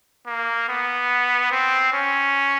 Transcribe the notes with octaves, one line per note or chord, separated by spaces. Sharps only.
A#3
B3
C4
C#4